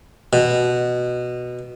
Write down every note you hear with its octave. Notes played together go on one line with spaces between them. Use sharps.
B2